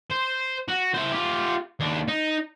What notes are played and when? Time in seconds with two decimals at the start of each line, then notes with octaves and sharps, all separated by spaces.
0.10 C5
0.68 F#4
0.95 E4 C5
1.12 F4 G4
1.80 D#2 D4
2.08 D#4